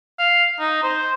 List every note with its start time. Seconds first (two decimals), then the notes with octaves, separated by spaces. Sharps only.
0.19 F5
0.60 D#4
0.83 C5